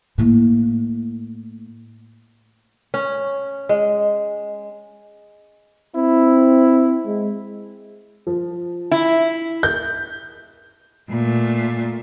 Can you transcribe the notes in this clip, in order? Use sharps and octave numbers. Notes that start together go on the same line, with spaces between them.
A2 A#3
C#4
G#3
C4 E4
G#3
F3
E4
G6
A#2 A3